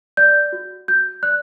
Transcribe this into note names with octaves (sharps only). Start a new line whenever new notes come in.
D5 G6
F#4
F#4 G6
D5 F#6